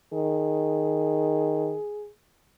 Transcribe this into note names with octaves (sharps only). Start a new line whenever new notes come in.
D#3 G#4